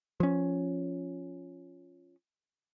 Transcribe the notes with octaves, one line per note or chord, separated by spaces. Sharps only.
F3 C#4